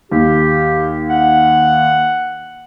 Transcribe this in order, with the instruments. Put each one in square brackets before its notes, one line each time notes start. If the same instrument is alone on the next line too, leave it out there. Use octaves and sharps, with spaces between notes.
[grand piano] D#2 [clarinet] G4
[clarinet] F#5